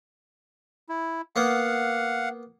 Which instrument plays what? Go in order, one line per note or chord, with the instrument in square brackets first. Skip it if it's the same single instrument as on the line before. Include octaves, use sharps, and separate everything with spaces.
[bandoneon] E4
[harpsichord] A#3 B3 [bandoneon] F5 F#5